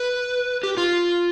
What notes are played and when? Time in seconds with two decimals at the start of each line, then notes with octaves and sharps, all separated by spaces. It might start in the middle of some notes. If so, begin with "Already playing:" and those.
Already playing: B4
0.63 G4
0.77 F4